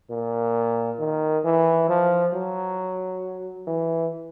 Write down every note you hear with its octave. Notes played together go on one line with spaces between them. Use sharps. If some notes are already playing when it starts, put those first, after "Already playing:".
A#2
D#3
E3
F3
F#3
E3